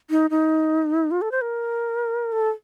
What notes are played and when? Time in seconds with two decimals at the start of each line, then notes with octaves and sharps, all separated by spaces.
0.10 D#4
0.30 D#4
1.11 F4
1.22 A4
1.32 C5
1.41 A#4
2.32 A4